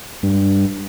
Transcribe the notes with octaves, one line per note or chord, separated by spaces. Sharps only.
G2